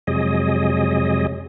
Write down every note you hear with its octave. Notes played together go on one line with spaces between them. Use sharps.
F2 C3 F#3 G#3 G#4 D#5